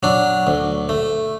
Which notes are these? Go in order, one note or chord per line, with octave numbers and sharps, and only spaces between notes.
F#3 D4
D2
A3